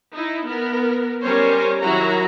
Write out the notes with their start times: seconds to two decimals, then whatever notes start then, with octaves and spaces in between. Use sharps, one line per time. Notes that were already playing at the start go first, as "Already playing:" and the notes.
0.13 D#4 E4
0.46 B3 A#4
1.23 G3 C#4 A#4 C5 C#5
1.80 D#3 F#3 E4 F#4 A#5